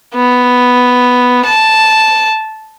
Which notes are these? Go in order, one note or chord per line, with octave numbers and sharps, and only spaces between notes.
B3
A5